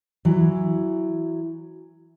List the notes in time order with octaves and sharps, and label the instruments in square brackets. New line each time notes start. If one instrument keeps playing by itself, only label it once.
[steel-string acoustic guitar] E3 F#3